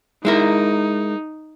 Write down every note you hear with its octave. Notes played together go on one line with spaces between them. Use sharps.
G#3 D#4 E4 A#4